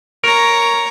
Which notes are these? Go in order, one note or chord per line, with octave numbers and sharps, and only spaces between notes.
A#4 C#5 A#5